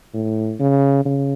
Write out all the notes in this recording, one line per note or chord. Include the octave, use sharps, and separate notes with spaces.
A2
C#3
C#3